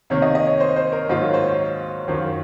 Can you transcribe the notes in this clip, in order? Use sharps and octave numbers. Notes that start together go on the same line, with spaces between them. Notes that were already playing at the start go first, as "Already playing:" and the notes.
C3 D#3 A#3 C#5
D#5
D#5
C#5
C5
C5
A#4
G#2 D#3 F#3 A#3 F4 C5
C#5
C5
C#5
F#2 D#3 F#3 C#4 F4 C5